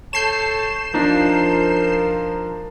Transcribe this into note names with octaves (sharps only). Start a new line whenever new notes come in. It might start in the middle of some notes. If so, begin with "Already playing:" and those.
A4 C#5 A5 G6 C7 E7
F3 D4 D#4 A#4